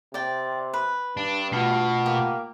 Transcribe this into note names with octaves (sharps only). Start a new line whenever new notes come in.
C3 D5 G5
B4
G2 D4
B2 A3 F4 F#5
A#3 G4